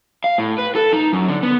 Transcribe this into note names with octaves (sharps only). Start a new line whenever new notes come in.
F5
A2
B4
A4
D#4
F#2
D3
B3